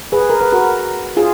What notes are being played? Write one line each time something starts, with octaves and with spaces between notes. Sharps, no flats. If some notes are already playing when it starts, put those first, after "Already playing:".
G#4 B4
A#4
B4
F#4 A#4
F4 G#4